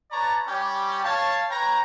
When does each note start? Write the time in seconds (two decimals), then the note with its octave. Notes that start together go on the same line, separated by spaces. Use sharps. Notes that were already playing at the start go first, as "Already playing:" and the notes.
0.11 B4 C#5 D5 A5 A#5 C#6
0.46 G3 C#4 G4
1.04 C#5 F5 A5
1.50 B4 C#5 G5 A#5